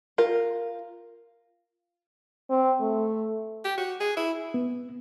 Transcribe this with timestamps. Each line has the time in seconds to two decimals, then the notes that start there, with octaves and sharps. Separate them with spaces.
0.18 F4 A#4
2.50 C4
2.81 A3
3.65 G4
3.78 F#4
4.00 G#4
4.17 E4
4.54 B3